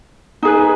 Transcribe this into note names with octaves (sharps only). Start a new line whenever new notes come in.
D#4 G#4 B4